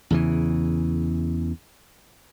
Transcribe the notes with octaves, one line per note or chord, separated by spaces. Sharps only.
E2 C#3 E3